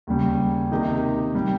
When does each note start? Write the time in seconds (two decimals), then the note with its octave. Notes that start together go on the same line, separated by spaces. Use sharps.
0.07 D#2 C#3 G3
0.71 C3 D#3 A#3 D#4 G4
1.35 G3